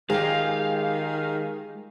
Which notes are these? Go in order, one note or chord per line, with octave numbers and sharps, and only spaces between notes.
D#3 G#3 F4 G4 G#4 F5